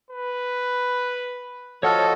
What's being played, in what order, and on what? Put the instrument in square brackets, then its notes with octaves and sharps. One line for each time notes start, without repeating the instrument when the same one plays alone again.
[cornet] B4
[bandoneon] F3 F#4 D#5 [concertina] A4 [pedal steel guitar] C#5 F#5 F6